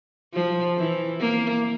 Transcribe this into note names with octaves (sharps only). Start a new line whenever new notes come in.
F3
E3
A#3